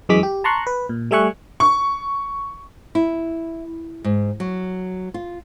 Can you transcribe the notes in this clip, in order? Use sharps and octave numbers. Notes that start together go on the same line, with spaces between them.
F#2 E3 G#3 G#4 D6 B6
G4
A5 A#5 C6 C#6 F#6
B4
A#2
G3 A3 E5 G#5 C#6 F#6
C#6
E4
G#2
F#3
F4